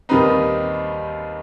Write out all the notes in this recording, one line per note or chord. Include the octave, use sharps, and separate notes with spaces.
D#2 D#3 G3 C4 D#4 B4